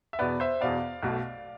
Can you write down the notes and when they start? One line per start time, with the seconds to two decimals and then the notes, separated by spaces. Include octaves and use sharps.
0.13 E5
0.19 E2 B2 B3 B4 D5
0.40 C5 E5
0.61 E2 B2 B3 D5 F5
1.03 B1 B2 A3